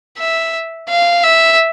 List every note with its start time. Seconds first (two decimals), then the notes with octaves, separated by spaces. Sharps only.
0.18 E5
0.90 F5
1.24 E5